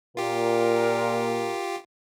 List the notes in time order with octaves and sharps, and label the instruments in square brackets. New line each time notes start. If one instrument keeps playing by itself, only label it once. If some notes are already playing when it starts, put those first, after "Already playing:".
[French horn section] A#2 [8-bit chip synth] F4 G4 [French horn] A#4